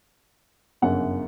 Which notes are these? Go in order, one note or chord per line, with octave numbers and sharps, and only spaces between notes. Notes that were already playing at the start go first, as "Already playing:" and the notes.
G1 F#2 C#3 F#5